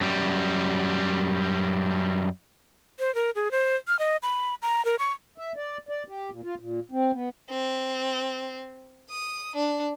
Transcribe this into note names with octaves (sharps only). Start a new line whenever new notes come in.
F#2 G3
C5
A#4
G#4
C5
F6
D#5
B5
A#5
A#4
C#6
E5
D5
D5
G4
A#2
F4
A#2
C4
B3
C4
D#6
D4